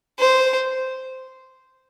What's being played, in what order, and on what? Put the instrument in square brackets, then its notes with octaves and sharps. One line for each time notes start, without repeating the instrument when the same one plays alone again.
[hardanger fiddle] C5